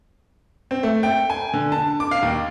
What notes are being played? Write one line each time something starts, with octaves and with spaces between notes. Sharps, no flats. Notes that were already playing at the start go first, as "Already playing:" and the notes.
C4
A3
G5
G#5
D3
A5
D6
F5
D#2